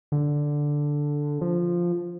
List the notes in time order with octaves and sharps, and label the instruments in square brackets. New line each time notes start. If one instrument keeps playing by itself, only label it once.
[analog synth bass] D3
F3